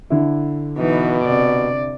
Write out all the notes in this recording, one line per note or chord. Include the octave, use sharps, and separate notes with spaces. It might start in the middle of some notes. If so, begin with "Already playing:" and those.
D3 E4
B2 E3 D#4
C3 D5